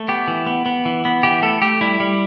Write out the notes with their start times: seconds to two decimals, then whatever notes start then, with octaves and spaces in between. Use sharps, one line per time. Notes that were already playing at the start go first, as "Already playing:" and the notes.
Already playing: A3
0.08 B3 G4
0.28 E3
0.47 B3
0.66 B3
0.85 E3
1.05 B3
1.23 E3 G4
1.42 A3 A4
1.62 A3 G4
1.81 G3 E4
2.00 G3